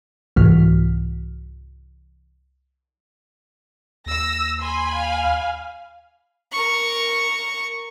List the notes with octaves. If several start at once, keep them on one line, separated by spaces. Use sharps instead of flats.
C2 G#2 E3 F#4 F6 B6
D#2 E6 A#6
G#5 B5 C6
F5
A#4 C#6